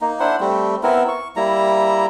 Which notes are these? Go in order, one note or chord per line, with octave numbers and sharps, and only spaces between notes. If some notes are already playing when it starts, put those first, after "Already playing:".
A#3 D#4
D4 E4 C5 F#5
G3 A3 C4
B3 C4 E4 A#4
C#6
G3 A#3 E4 A#5